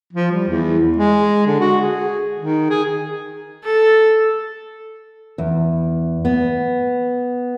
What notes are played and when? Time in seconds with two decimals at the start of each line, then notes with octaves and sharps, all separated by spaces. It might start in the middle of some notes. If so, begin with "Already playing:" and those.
0.13 F3
0.32 G3
0.49 E2
0.97 G#3
1.47 D3
1.60 F#4
1.82 G#4
2.40 D#3
2.70 G#4
3.64 A4
5.38 E2
6.25 B3